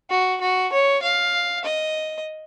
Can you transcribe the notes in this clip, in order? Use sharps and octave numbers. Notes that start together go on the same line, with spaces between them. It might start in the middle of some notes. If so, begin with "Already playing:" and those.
F#4
F#4
C#5
F5
D#5